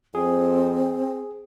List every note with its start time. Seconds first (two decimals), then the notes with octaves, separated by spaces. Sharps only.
0.15 F2 C4 G#4